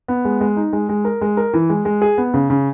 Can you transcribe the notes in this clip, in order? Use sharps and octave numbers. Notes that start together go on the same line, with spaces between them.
B3
G#3
G#3
D#4
G#3
G#3
A#4
G#3
A#4
E3
G#3
G#3
G#4
B3
C#3
C#3